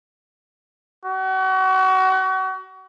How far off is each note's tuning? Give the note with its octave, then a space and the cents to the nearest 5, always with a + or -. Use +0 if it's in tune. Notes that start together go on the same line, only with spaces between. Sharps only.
F#4 +35